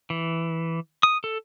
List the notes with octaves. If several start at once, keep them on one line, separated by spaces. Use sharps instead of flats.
E3
D#6
A4